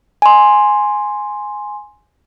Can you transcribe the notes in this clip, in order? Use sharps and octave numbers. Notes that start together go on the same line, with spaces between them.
G#5 C6